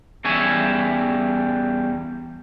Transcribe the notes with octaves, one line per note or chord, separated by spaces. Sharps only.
E2 G3 C#4 E5 G#5